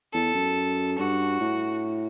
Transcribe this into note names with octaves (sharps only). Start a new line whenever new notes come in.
E2 A4
F#2
G2 F#4
A2